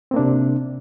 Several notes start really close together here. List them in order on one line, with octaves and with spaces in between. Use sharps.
C4 A#3 D4 C3